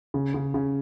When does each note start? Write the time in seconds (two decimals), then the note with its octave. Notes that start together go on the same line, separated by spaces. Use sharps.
0.14 C#3
0.34 C#3
0.54 C#3